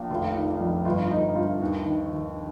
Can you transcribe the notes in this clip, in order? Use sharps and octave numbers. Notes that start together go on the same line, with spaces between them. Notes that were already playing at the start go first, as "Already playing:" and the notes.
Already playing: A#1 A#2
F1 F4
D#3
F2
G1 F4
G1 D#4
G2 F4
D#2
D#3
D#3